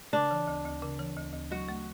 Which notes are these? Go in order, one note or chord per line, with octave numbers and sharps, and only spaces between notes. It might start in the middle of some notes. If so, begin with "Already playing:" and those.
C#3 D4
E3
D2
D2
C#3
E3
D2
D2
F#3 F#4
A3